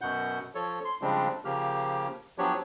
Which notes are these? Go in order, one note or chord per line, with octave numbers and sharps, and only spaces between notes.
F#2 B2 F#5 G6
F3 A4 C#5
C6
C#3 F3 G3 G#3 C4 D4
C#3 F3 A#3 G4 F6
F3 F#3 B3 D4 G4 C#5